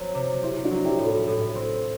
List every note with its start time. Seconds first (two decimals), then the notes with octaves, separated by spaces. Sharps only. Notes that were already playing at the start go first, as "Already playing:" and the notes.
Already playing: F#3 C4
0.14 C3
0.43 C4 E4 G4
0.64 D4 F#4
0.71 F#3
0.85 E4 G4
0.98 A2
1.05 F#4 A4
1.27 A2
1.55 C4